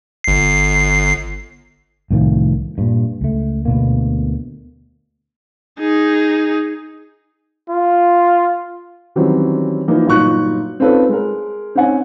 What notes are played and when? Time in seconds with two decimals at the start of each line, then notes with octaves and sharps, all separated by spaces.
0.24 G1 C7
2.10 C2 A2 D#3 F3
2.78 G2 A#2
3.21 C#2 A3
3.65 D2 B2 A#3
5.80 D#4 G#4
7.70 F4
9.16 D#3 E3 F#3 G3 C4 C#4
9.88 E3 F3 A#3 D#4
10.06 G1 A#2 F#3 D#4 C#6 F#6
10.80 C4 C#4 D#4 F4 A4 B4
11.09 G#3 A#4
11.75 C4 C#4 D#4 F#5 G#5